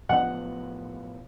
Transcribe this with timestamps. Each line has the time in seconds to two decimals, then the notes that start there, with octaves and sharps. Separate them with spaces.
0.09 A2 F3 B3 F#5